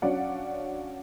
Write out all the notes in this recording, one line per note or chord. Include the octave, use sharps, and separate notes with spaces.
F#3 C#4 D4 D5 F5 F#5